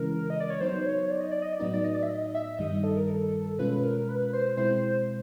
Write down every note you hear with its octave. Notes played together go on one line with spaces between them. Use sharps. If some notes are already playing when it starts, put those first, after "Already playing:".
Already playing: C#3 E3 G#3 C#4 E4 A#4
D#5
D5
C#5
F#3 B3 D#4 C5
C#5
D5
D#5
D5
D#5
D5
A2 F#3 B3 D#4 D#5
D5
D#5
D5
E5
D#5
E5
G2 D#3 G3 D#5
A4
A#4
A4
B2 G#3 C#4 F4 B4
A#4
B4
C5
B2 G#3 C4 E4 C5